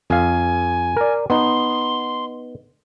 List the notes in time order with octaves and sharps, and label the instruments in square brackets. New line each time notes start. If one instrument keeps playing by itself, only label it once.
[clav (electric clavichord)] F2 F5 [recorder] G#5
[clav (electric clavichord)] A#4 D5
[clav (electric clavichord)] B3 D#4 [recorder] C6